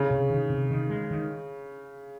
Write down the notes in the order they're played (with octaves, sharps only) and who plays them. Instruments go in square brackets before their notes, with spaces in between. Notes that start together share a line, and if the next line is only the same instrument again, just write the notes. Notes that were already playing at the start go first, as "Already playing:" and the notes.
Already playing: [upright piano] C#3
[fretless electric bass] C3
D#3
C3
D#3
G#3
D#3